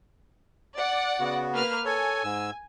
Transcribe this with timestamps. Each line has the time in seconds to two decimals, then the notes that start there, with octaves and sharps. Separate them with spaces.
0.76 D5 F#5
1.20 C#3 B3 F#4
1.53 A#3 B4 F6
1.85 A4 C#5 G#5
2.24 G#2 E6